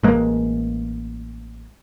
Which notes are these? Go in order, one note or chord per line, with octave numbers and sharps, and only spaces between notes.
A1 G#3 A#3